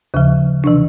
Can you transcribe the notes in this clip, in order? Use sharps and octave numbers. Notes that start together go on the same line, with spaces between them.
D#2 C#3 F3
C3 E3 D4